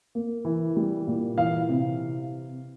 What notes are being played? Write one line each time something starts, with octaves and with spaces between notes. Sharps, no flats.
A#3
E3
G3
A#2
E3 F5
C3